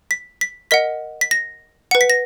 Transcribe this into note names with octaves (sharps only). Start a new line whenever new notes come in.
B6
B6
A#4 D#5 F#5 B6
B6
A#6
B4 F#5 C#7
B6
A#6